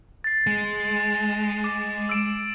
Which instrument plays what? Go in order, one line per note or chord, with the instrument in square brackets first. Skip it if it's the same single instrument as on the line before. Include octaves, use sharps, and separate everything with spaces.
[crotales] A6 C7
[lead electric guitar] G#3
[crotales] D6
E6 D7 E7